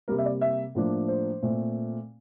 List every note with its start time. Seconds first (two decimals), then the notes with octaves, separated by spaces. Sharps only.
0.08 C3 G3 A#3 A#4
0.18 E5
0.25 D5
0.41 E5
0.75 A2 F3 A#3 D4
1.08 C5
1.42 A#2 A3 C4